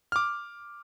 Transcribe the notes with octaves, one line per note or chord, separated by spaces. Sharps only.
D6 F6